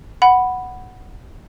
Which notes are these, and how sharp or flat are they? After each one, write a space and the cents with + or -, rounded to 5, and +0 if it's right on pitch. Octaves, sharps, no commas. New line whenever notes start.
F#5 +0 B5 +0